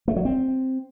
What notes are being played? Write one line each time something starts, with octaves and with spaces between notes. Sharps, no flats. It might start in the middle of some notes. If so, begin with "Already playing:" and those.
A3
F#3
C4